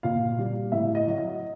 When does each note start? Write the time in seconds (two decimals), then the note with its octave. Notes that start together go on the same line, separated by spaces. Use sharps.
0.03 A#2 F5
0.38 G3
0.72 A2 E5
0.95 D#5
1.07 F#3
1.18 D#5